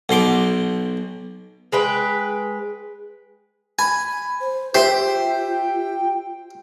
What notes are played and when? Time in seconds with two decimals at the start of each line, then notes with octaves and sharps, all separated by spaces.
0.09 B1 B2 C6 D6
1.72 G#3 B4 G5
3.79 G#5 B5
4.41 C5
4.75 F4 G4 C5 E5 G5